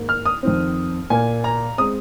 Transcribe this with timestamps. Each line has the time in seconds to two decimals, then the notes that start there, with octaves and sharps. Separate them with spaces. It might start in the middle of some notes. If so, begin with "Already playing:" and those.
Already playing: G#2 D#3 A#3
0.09 F6
0.25 D#6
0.43 F2 D#3 C4
1.10 A#2 A#3 G#5
1.44 A#5
1.78 G#3 C4 D#6